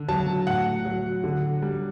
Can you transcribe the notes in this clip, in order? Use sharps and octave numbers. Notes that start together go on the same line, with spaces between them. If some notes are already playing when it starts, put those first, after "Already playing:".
Already playing: D3
F#3 A5
A2 F#5
F#3
D3
G3